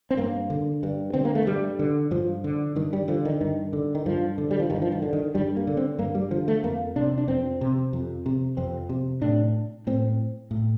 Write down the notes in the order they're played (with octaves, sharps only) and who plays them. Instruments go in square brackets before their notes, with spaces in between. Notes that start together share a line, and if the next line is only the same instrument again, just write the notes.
[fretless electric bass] C4
G2 A#3
D3
G2
D3 C4
A#3
A3
G2 G3
D3
G2 F3
D3
G2 D#3
G3
D3 F3
D#3
G2 D#3
D3
D#3
G2 F3
D3
G3
F3
G2 D#3
F3
D#3
D3
D#3
G2 G3
A#3
D3
C4
G2 A#3
G3
D3 F3
A3
F2 A#3
C3 D4
D4
F2 C4
C3
F2
C3
F2 C4
C3
A2 D4
A2 C4
A2